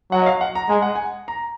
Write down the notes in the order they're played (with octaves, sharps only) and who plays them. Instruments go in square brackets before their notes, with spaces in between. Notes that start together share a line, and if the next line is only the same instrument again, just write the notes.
[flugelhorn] F#3 [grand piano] F#5
[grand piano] D#5
F5
F#5
A#5
[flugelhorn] G#3 [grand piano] G#5
[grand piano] F#5
G#5
A#5